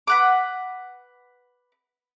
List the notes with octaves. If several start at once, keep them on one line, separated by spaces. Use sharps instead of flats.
B4 F#5 D6